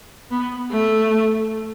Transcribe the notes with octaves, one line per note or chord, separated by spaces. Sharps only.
B3
A3